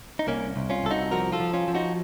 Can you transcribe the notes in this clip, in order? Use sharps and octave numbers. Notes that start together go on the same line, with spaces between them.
D#4
C2 A#3 C#4
C2
C#4 F4
C2 A4
D#4 F#4
F3 F#4 A#4
F4 A4
F3
C#4 F4
F3
D#4 F#4